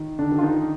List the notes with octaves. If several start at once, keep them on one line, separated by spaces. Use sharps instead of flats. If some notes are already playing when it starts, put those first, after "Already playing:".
Already playing: D#3
D3 D4
D#3
F4
D#3 D#4